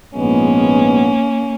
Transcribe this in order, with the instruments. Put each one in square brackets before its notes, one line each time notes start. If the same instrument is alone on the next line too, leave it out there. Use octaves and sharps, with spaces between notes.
[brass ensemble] A#1 G#2 F3 G#3 B3 [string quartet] A#3 C#4